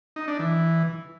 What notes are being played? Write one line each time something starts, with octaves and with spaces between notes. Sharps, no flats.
D#4
D4
E3